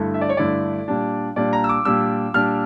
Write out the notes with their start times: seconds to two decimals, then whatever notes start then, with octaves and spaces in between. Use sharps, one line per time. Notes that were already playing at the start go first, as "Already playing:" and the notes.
Already playing: G2 D3 A3 E4
0.14 E5
0.21 D5
0.29 C#5
0.37 G2 D3 A3 E4 D5
0.88 A#2 G3 D4
1.36 A#2 G3 D4 D5
1.53 A#5
1.64 E6
1.69 D6
1.85 A#2 G3 D4 E6
2.34 A#2 G3 D4 F6